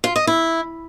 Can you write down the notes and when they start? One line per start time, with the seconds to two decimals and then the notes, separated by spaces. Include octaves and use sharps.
0.04 F4
0.16 D#5
0.27 E4